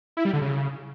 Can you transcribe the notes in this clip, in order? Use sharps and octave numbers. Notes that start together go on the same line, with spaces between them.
E4
G3
D3
C#3